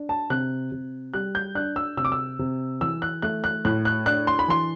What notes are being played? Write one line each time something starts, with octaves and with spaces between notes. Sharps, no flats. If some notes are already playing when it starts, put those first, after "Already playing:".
Already playing: D4
A5
C3 F#6
C3
G3 F#6
G6
D4 F#6
E6
C3 E6
D6
E6
C3
E3 E6
F#6
A3 F#6
F#6
A2 F#6
F#6
D4 F#6
C6
B5
E3 C6